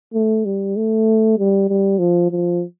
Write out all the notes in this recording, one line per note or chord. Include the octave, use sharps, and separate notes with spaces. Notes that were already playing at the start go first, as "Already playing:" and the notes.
A3
G3
A3
G3
G3
F3
F3